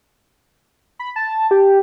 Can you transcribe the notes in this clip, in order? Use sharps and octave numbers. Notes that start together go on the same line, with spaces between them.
B5
A5
G4